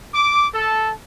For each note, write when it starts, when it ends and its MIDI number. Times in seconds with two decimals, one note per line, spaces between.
0.13 0.45 86
0.54 0.92 69